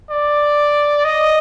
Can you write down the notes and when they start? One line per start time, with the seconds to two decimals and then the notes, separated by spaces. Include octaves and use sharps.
0.10 D5
1.04 D#5